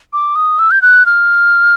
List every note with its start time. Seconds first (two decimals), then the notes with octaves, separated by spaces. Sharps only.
0.13 D6
0.36 D#6
0.59 E6
0.71 G6
0.82 F#6
1.06 F6